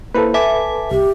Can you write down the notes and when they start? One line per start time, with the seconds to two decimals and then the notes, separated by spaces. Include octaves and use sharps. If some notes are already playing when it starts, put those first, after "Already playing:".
0.15 A#3 E4 A4 B4 C5
0.34 E5 G#5 A5 D6
0.91 C2 G4